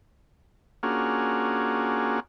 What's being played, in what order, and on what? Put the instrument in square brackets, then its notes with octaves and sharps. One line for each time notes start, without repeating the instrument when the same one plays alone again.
[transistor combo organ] A#3 C#4 D4 F4 F#4 G#4